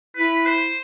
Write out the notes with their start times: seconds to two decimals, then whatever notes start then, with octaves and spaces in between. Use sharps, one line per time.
0.16 E4 B4
0.46 C5